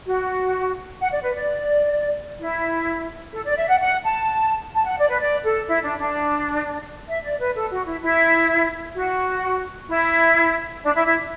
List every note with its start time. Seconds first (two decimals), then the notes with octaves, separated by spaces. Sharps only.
0.06 F#4
1.00 F#5
1.11 D5
1.23 B4
1.35 D5
2.39 E4
3.33 A4
3.46 D5
3.57 E5
3.69 F#5
3.80 F#5
4.04 A5
4.74 A5
4.86 F#5
4.98 D5
5.09 B4
5.21 D5
5.44 A4
5.68 E4
5.83 D4
5.99 D4
7.08 E5
7.24 D5
7.40 B4
7.55 A4
7.71 F#4
7.86 E4
8.02 E4
8.96 F#4
9.89 E4
10.83 D4
10.95 E4
11.06 E4